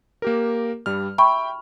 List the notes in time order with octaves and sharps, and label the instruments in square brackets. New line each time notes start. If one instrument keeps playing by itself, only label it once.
[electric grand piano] A#3 G4 A#4
G2 G3 F6
[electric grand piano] E5 G5 [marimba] B5 C#6